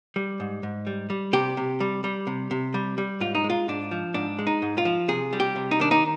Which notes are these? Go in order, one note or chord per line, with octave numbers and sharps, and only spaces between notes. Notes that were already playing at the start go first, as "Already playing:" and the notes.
G3
G#2
G#2
G3
G3
C3 G4
C3
G3
G3
C3
C3
G3
G3
G#2 F4
D#4
G#3
F4
G#2 D4
F3
G#2 D4
G#3
D#4
G#2
F4
F3
C3 G#4
G3
G4
C3
D#4
D#3 D4
D#4